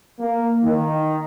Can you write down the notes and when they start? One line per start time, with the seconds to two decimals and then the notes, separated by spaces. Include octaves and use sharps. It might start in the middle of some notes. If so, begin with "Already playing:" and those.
0.19 A#3
0.63 D#3